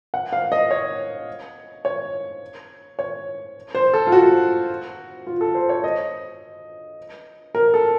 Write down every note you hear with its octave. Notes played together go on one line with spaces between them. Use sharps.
F#5
F5
D#5
C#5
C#5
C#5
C5
A4
F4
F#4
F4
A4
C5
C#5
D#5
A#4
A4